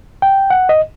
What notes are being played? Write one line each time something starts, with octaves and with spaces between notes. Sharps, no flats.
G5
F#5
D#5